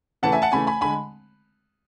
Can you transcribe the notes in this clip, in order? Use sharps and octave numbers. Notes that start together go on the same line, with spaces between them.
C#3 E3 A3 F#5 A5
E5 G#5
F#5 A5
C#3 E3 A3 G#5 B5
G#5 B5
D3 G#3 G#5 B5